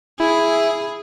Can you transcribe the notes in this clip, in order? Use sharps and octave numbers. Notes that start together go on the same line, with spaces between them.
E4 G#4